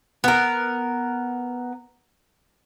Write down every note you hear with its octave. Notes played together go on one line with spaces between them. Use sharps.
B3 A#4